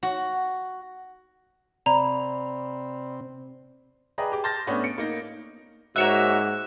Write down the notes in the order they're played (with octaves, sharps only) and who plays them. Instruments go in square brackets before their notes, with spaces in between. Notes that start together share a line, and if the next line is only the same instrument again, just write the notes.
[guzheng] F#4
[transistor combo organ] C3 C4 [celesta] D5 B5 [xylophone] A#5
[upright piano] G#4 B4 D5 D#5 G5 A#5
G4 G#4 D6
A5 C6 F6 G6 A6 A#6
A2 A3 B3 C#4 D4
C#7 D7
A#3 D#4 A#6
[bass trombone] G#2 [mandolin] A#3 C#5 E5 [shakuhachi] F#4 [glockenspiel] F#6 E7